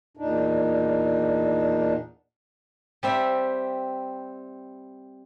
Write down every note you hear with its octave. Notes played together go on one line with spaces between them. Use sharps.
E2 A#2 D4 D#4
G3 C4 E5